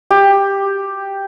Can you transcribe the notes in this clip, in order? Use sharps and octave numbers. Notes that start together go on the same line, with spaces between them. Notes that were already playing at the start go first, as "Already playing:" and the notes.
G4